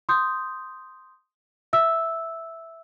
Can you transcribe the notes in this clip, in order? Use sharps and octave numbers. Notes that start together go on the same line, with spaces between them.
C6 D#6 G6
E5 E6